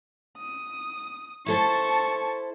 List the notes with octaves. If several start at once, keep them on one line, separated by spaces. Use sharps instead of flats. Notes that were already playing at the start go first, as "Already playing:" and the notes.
D#6
E4 A4 C5 A5 C#6